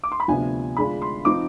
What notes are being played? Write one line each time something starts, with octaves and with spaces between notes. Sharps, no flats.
D6
C6
B5
D2 C3 F3 B3 D4 G#5
D3 G#3 D4 F4 B5
C6
F3 C4 D#4 D6